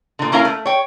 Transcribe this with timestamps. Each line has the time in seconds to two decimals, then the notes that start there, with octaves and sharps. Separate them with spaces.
0.19 A#2 D3
0.32 A#3 C#4 E4 A#4 F5
0.45 A3
0.66 C#5 G5